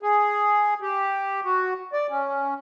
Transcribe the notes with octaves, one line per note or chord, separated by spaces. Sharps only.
G#4
G4
F#4
D5
C#4